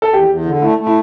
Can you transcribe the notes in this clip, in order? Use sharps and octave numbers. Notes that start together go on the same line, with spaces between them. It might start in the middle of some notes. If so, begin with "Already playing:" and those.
A4
E2 G4
E2
D3
A3 E4
A3
E4